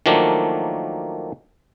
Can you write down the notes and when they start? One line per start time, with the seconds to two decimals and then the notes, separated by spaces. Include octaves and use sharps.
0.06 D#3 F3 F#3 A3 A#3 D4